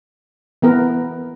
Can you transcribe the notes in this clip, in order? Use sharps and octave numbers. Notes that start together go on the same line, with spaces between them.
E3 B3 A#4